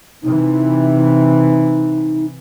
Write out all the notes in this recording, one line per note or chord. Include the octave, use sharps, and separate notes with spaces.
C3 E3 D#4